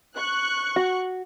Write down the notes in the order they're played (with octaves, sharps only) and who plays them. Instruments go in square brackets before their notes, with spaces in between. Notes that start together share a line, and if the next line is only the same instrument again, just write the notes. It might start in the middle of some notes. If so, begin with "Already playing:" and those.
[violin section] C#6 F#6
[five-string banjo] F#4